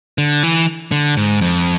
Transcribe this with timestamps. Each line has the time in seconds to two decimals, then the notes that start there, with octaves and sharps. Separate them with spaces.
0.18 D3
0.43 E3
0.92 D3
1.17 G#2
1.41 F2